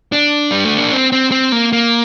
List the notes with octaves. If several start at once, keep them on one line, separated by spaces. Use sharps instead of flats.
D4
G3
A3
A#3
C4
C4
C4
A#3
A#3